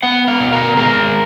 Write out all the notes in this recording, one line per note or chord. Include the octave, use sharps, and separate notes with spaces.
B3 F#5
F5
B2
A#4
G#3 A#4